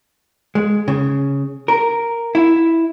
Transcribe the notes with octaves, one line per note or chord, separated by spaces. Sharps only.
G#3
C#3
A#4
E4